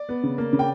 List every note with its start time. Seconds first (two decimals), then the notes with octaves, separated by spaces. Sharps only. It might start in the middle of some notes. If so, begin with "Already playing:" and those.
Already playing: D5
0.09 B3
0.23 C#3
0.38 A#3
0.53 C#3
0.59 G5